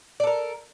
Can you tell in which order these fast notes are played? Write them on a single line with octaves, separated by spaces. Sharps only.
D5 A4 A#4